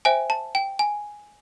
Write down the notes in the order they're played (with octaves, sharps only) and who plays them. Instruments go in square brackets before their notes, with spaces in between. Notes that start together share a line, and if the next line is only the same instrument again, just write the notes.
[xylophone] C5 E5 G5 G#5
A5
G5
G#5